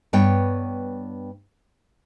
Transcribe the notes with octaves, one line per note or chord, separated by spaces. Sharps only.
G2 B3 C#5 G5